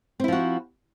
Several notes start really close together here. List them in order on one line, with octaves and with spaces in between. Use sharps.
C4 E4 F3 F#4